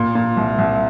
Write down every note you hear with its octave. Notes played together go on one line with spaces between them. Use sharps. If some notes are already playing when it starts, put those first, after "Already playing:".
Already playing: A#2
A#2
C2
C2